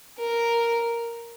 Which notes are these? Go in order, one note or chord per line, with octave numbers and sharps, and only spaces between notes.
A#4